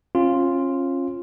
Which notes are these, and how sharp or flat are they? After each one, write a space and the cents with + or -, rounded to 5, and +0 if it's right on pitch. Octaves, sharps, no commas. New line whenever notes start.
C#4 -35 F4 +0